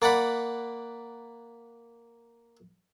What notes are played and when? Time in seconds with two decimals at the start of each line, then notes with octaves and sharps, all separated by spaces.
0.02 A#3 D5 F#5 B5